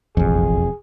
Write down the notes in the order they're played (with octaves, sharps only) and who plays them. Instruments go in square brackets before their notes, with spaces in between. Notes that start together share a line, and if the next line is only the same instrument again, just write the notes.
[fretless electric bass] E1 F2 [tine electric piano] A1 [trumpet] G#4